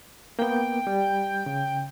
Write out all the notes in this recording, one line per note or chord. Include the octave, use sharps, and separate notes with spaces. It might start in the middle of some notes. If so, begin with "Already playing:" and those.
A#3 B3 G5
G3
C#3